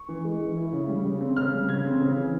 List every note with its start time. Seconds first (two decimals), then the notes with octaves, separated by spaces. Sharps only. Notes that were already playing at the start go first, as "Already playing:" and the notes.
Already playing: C#6
0.09 E3
0.24 G#3
0.40 E3
0.57 E4
0.72 C#3
0.88 G3
1.05 C#3
1.21 C4
1.36 C#3 F6
1.53 G3
1.69 C#3 G#6
1.85 C4
2.01 C#3
2.16 E3